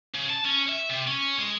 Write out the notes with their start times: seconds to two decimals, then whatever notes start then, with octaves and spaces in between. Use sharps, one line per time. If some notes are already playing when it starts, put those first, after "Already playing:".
0.14 C#3
0.29 A5
0.45 C#4
0.68 E5
0.90 C3
1.07 C#4
1.39 G#3